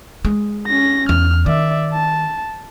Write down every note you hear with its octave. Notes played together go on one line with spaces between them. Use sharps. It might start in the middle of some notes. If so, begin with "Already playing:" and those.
G#3
C#4 A#6
E2 F6
D#3 D5 E5
A5